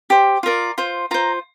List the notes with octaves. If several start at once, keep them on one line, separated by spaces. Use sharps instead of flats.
G4 C5
F4 A#4 D5
F4 C5
F4 C5 A#5